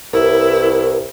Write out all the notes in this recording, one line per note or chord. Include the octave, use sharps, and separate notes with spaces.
C2 E4 A#4 B4